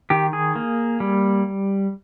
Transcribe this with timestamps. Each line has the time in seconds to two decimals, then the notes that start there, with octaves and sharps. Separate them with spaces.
0.10 D#3 G4
0.33 G#4
0.56 A#3
1.00 G3